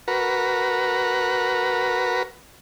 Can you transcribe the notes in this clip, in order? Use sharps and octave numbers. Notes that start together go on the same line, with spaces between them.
F#4 A#4 B4